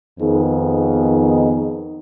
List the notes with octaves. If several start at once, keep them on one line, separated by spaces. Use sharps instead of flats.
F2 D#3 B3 D#4 G#4